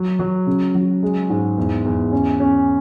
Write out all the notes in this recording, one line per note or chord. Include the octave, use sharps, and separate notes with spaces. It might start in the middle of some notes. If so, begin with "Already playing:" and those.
Already playing: F#3
F#3
C#3
F#3
G#3
G#2
E2
E2
C#4
C#4